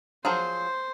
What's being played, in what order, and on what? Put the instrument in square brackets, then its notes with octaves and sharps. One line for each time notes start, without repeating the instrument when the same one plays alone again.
[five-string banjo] F3 F#3 G#4 [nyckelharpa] C5